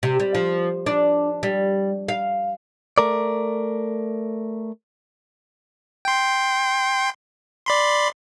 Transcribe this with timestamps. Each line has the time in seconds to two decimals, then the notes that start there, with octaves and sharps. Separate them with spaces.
0.03 C3
0.20 G3
0.35 F3
0.86 D4
1.43 G3
2.08 F5
2.98 A3 A#4 D5
6.05 G5 C6
7.66 D5 B5 C6